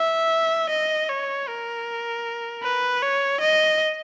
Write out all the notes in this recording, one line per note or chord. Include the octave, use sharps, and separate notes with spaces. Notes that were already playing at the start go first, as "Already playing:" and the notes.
Already playing: E5
D#5
C#5
A#4
B4
C#5
D#5